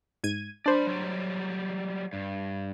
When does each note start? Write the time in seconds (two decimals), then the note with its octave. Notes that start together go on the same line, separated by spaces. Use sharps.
0.24 G#2 G#6 D#7
0.66 D4 C5 D5 B5
0.87 F#3 G3
2.13 G2